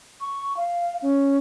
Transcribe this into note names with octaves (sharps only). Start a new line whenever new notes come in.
C#6
F5
C#4